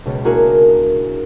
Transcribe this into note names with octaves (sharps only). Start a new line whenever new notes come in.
C#2 B2
A#3 D4 E4 F#4 G#4 A#4